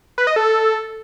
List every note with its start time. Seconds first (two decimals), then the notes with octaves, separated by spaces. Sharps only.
0.18 B4
0.27 D#5
0.36 A4